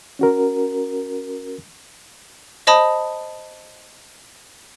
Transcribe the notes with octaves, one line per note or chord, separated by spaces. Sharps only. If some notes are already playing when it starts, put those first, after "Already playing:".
C#4 F#4 A#4
C5 D#5 A5 B5 D#6